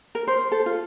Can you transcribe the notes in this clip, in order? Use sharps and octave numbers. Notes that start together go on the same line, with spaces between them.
A#4
C5
A4
F4